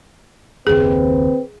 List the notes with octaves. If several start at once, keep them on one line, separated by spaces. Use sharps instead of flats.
F#1 D#2 C4 G#4 B4